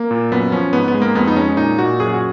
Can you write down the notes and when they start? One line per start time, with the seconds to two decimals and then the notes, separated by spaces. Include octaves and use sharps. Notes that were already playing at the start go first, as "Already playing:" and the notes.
Already playing: A#3
0.11 A#2
0.31 F#2 B3
0.52 F3 C#4
0.73 G#2 B3
0.88 B3
0.94 G#3
1.02 A#3
1.15 F2 B3
1.28 D#4
1.36 G#3 C#4
1.57 A#2 D#4
1.78 A#2 F#4
2.00 F#2 G#4
2.14 F#4